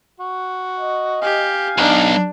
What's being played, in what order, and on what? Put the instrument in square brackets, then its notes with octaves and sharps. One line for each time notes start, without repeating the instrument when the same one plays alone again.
[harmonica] F#4
[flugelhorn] D#5
[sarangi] G4 [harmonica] F5 G#5
[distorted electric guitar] B1 [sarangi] D4 [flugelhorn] D#4